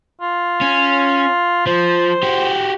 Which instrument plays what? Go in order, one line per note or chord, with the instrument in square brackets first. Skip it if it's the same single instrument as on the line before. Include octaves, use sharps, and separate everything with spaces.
[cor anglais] F4
[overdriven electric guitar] C#4
[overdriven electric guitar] F3 [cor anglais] C5
[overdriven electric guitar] F#4 G4